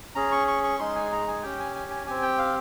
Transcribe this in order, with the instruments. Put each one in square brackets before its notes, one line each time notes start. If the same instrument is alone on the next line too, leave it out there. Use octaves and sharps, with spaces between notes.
[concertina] C#4 G#4 A#5
C#6
C#6
C#6
G#3 D#4 G#4 C6
G#5
A#5
G#5
C#4 G4 G5
G#5
G#5
G#5
C4 G4 G#5
G5
F5